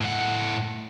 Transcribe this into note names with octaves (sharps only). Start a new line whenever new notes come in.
A2 F#5